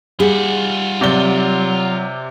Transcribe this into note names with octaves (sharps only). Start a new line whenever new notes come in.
G3 F4 G#4 F#5
C3 F#3 D5 G7